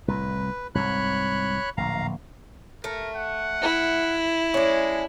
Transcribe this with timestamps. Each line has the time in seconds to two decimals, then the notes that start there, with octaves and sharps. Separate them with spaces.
0.08 C2 A2 B4
0.75 C2 G#2 C3 C#5 B5 F#6
1.77 D1 A#1 F5 A#5
2.84 A3 A#4
3.16 F#5
3.62 E4
4.54 G#3 C#4 D4